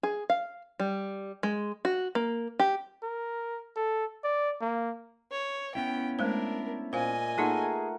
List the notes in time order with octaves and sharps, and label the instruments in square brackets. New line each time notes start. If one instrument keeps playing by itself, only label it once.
[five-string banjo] G#4
F5
G3
G#3
F#4
A#3
G4
[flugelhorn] A#4
A4
D5
A#3
[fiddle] C#5
[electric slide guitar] B3 C#4 E4 [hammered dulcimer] F5 [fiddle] G5
[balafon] G#3 A3 C5 [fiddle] D4 A#4 [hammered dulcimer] E5
[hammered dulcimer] A#2 [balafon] C5 F5 [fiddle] D#5 G#5
[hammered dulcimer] A3 A#4 F#5 [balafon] A#3 D#4 F4 [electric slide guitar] G#4